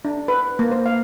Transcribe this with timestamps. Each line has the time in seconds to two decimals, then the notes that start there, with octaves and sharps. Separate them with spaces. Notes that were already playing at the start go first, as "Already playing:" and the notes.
0.05 D4
0.28 B4
0.59 A#3
0.71 C5
0.86 F5